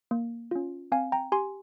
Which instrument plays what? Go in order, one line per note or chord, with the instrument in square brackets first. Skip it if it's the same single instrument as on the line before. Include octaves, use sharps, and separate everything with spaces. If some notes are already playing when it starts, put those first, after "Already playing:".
[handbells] A#3
C#4 F4
C4 F5 G#5
G5 A#5
G4 G#5 C6